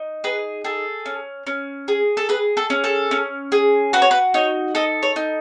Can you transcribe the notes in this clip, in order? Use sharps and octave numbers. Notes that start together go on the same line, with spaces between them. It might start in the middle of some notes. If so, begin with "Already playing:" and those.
Already playing: D#4
G#4 B4
G#4 A4
C#4
C#4
G#4
A4
G#4 B4
A4
C#4
A4
C#4
G#4
F#4 B4
C#5
B4
D#4 C#5
A4 D#5
C#5
D#4